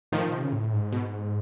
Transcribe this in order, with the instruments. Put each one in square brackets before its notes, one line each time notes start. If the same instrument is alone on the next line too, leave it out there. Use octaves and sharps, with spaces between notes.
[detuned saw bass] A2 [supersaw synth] D#3 F3
[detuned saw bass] A#2
C3
C#3
A2
G#2
[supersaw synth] B2